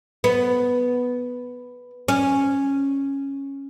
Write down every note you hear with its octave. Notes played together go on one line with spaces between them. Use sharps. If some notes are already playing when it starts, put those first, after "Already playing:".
B3
C#4